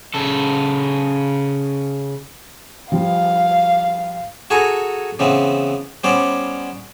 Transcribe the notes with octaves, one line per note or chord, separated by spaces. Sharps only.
C#3 A4
F3 G3 F5
F#4 G#4 A4 G#5 A#5
C#3 E3 B3 C4
G3 B3 C#4 C5 D5